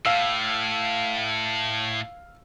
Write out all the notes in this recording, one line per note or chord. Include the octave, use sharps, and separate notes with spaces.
A2 F5 E6